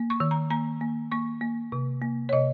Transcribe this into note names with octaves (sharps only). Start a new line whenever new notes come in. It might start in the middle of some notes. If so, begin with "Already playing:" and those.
Already playing: A#3
C#6
D#3
A#5
A#3 A#5
A#3
A#3 C#6
A#3
C3
A#3
C#5
C3 D#5